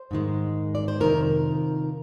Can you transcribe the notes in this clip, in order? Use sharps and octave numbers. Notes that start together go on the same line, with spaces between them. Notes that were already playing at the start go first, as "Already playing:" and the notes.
Already playing: C5
G#2 D#3 G#3
D5
C5
F2 C3 D#3 A#4